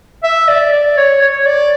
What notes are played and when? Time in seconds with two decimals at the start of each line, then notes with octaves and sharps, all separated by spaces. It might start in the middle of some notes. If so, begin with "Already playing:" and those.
0.23 E5
0.48 D5
0.73 D5
0.97 C#5
1.22 C#5
1.46 D5